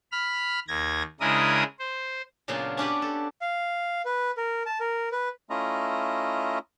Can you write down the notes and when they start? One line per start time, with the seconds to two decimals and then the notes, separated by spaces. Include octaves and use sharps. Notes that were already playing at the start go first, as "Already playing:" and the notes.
0.12 B5 F6
0.68 D#2 G#6 A#6
1.20 C#3 G#3 D4 E4 A#4 D#6
1.79 C5
2.48 A#2 C#3 F#3 B3 D4 F4
2.77 C#4 D4 G4 B4
3.02 A4
3.41 F5
4.05 B4
4.37 A#4
4.66 A5
4.80 A#4
5.12 B4
5.50 A3 C#4 E4 F4 D#5 A#5